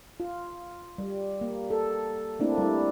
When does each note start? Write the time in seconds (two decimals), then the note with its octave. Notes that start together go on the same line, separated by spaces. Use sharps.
0.20 F4
0.98 G3
1.41 A#3
1.70 A4
2.40 A3 A#3 C4 D4 E4
2.58 G3 E4